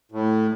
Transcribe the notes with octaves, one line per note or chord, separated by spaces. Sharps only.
A2